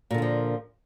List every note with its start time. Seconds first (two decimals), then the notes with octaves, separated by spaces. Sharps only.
0.11 A#2
0.14 D3
0.18 A#3
0.22 F3